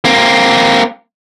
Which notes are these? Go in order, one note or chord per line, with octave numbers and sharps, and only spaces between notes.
A#3 C4